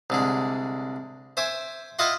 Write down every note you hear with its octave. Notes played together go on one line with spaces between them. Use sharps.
C2 D3 G#3
C5 E5 G#5 D6
E4 F4 D#5 F5 F#5 C6